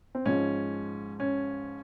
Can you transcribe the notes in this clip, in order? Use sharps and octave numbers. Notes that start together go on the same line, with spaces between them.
C4
G#2 F3 G#3 C#4
C#4